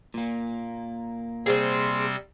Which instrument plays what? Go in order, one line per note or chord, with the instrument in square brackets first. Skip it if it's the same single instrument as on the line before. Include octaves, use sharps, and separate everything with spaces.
[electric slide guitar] A#2 A#3
[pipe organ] C3 G3 C4 [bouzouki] G#4 B4 C5